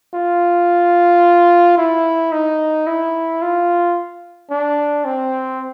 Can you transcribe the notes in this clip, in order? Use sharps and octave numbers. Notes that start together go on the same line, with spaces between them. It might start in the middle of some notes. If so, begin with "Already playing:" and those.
F4
E4
D#4
E4
F4
D4
C4